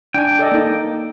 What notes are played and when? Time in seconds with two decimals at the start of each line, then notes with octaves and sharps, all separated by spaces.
0.14 D4 G5 G#5
0.39 A4 D5 D#5
0.52 A#3 D#4